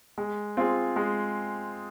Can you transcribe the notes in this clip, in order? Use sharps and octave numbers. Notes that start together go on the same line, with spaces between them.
G#3
C4 F4 G#4
G#3